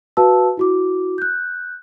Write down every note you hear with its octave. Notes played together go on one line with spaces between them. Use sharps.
F#4 B4 F5 A5 E6
E4 F#4 D6
F#6 G6